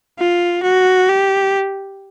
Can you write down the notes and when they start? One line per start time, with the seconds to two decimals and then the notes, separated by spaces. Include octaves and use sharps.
0.18 F4
0.63 F#4
1.09 G4